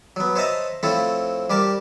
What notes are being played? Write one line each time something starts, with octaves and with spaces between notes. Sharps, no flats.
F#3 B3
C5 C#5 D#5 E5 A5 A#5
F3 A3 C4 E4 A4 C#5
G3 G4 A#4 A5